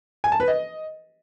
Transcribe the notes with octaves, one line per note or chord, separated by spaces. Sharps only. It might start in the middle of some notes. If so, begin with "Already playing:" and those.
G#5
A5
B4
D#5